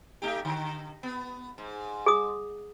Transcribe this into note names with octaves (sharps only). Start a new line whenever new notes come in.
A3 D#4 G4
D3
B3
G#2
G#4 D#6